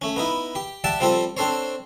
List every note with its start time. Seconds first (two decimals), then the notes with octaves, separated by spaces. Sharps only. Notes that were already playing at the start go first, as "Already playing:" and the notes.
0.02 A3 C#4
0.16 B3 D#4 E4
0.55 G4
0.84 G4 D5 E5 F#5 A5
1.00 F3 G3 C4 F4 A4
1.37 C4 D4 A4 C5 C#5